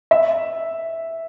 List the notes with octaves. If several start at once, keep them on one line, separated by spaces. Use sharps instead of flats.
E5